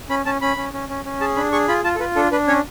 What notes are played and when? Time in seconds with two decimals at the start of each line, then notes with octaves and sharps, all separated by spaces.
0.09 C#4 B5
0.25 C#4 A5
0.41 C#4 B5
0.57 C#4
0.73 C#4
0.89 C#4
1.05 C#4
1.20 G#4 A5
1.36 D4 B5
1.52 G#4 C#6
1.68 F4 B5
1.84 F4 A5
1.95 A4
2.00 F4 B4
2.16 D4 A4
2.32 D4 B4
2.48 C#4 C#5